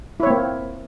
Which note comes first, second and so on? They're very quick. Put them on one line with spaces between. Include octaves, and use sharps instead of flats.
E4 C#5 C4 A#3